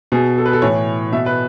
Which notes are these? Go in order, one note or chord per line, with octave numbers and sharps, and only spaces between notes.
B2 G#4
A4
B4
A4
A2 E3 C#5
B2 E5
B4